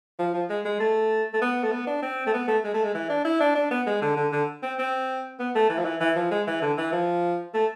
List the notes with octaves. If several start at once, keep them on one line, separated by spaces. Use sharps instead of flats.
F3
F3
G#3
G#3
A3
A3
B3
A3
B3
D4
C4
A3
B3
A3
G#3
A3
G#3
E3
D4
E4
D4
D4
B3
G#3
D3
D3
D3
C4
C4
B3
A3
E3
F3
E3
E3
F3
G#3
E3
D3
E3
F3
A3